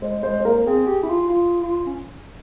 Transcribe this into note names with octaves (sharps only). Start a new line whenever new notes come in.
G#3 C5
G#3 C5
C5
A#3 A#4
C4 G#4
G4
E4
F4
F4
F4
C#4